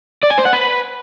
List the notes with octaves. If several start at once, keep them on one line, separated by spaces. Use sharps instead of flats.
D5
G#5
C5
F#5
B4